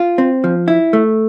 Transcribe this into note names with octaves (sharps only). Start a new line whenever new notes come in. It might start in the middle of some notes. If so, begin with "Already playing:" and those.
Already playing: F4
C4
F3
E4
A3